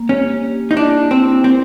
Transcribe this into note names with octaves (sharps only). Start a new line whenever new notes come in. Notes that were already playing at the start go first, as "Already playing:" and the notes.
Already playing: A#3
C#4 G4
G4
D#4
D4 E4
C4 E4
C4 A#4